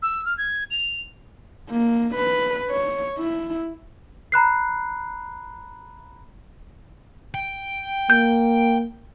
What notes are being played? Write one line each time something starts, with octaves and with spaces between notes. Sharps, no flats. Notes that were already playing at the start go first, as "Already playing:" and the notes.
E6
F6
G#6
F7
A#3
B4
C#5
E4
A#5 B5 F#6 C7
G5
A#3 G6